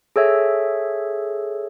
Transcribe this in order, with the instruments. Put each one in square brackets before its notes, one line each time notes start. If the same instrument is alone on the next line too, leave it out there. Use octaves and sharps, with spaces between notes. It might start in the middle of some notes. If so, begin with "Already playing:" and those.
[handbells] G#4 A4 C#5 E5